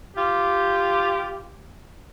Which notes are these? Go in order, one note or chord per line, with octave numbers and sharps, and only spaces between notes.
F4 G4